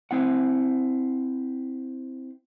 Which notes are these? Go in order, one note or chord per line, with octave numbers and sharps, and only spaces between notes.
C4 E4 F#5